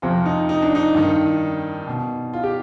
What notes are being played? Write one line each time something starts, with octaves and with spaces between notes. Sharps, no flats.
F2 C3 F3 F4
D#4
D#4
D4
D#4
G2 D#3
B2
F4
G4